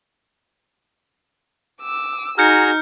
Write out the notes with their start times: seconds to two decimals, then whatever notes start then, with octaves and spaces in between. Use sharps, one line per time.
1.82 D6 E6
2.38 D#4 F#4 G#4 A#5 F6 G6 C#7